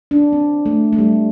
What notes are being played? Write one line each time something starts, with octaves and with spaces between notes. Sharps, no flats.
D4
C4
A3
A3
G3